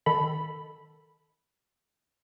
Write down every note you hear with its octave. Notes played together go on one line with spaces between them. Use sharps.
D#3 A4 B5